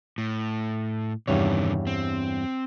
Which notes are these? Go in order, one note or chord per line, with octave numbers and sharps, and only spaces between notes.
A2
E2 G2 C3 D#3 C#5
C4